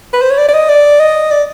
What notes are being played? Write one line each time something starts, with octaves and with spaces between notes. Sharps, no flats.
B4
C5
C#5
D5
D5
D#5
D5
D#5
D5